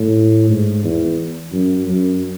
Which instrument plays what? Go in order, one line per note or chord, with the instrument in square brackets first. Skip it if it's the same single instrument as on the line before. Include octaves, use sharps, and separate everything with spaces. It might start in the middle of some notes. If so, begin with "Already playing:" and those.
Already playing: [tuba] A2
G#2
E2
F#2
F#2